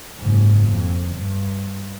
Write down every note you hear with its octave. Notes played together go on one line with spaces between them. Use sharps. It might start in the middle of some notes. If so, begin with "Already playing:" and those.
F#1 G#2
F2
G2